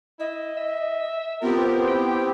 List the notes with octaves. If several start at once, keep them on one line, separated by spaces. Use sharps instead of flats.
E4 D#5
E5
B3 C4 F4 G4 A#4
E4 G5